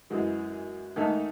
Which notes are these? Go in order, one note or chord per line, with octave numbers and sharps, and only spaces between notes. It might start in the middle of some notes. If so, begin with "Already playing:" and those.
F#2 E3 G#3
G#2 D#3 A3 D#4 A4